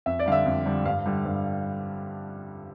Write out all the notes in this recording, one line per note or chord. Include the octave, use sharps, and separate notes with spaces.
F2 E5
D5
D3 G3 F5
E5
F2
D3 G3
G2 F5
D3 G3
G2